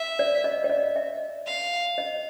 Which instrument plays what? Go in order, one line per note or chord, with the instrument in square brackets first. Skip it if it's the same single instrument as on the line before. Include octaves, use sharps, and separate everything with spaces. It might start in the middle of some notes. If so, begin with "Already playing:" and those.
Already playing: [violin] E5
[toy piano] D5
D#5
D5
D#5
E5
[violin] F5
[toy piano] D#5